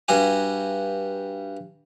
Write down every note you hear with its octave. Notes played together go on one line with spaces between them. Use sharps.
G2 G3 F#4 G#5